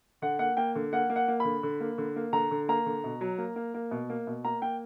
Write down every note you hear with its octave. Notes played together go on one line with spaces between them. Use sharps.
D3 F#5
A#3 F#5
A#3 G5
D3
A#3 F#5
A#3
F#5
A#3
D3 B5
D3
A#3
D3
A#3
D3 A#5
D3
A#3 A#5
D3
B2
F#3
A#3
A#3
A#3
B2
A#3
B2
A#3 A#5
A#3 G5